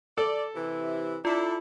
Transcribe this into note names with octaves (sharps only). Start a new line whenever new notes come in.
A4 D5
C3 E3 E4
D4 E4 F4 A4